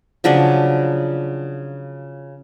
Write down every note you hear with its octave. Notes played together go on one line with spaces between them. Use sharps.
C#3 F3 F#3 D4